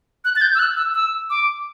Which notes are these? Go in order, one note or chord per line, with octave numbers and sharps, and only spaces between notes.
F#6
A6
G6
E6
F#6
E6
E6
D6